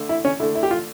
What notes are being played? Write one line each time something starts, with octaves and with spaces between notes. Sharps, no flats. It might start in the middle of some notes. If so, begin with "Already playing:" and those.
Already playing: D3 A3
E4
C#4
D3 A3 E4
E4
G4
F4